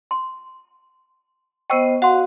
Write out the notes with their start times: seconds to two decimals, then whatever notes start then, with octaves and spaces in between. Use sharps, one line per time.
0.11 C6
1.70 B3 C5 D#5 G5 C#6 E6
2.02 F#4 F5 F#5 C6